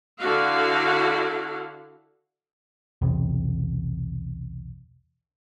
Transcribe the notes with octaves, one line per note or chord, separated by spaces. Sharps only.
D3 E4 F#4 F5
B1 E2 C3